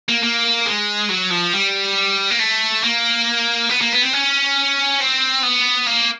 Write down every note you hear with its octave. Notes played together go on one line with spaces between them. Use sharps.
A#3
A#3
G#3
F#3
F3
G3
A#3
A3
A#3
B3
A#3
B3
C4
C#4
C4
B3
A#3